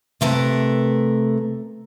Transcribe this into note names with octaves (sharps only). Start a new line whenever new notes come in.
C3 A3 A#4 B4